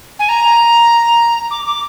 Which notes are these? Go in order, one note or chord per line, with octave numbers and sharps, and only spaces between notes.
G#5
A#5
D6
D6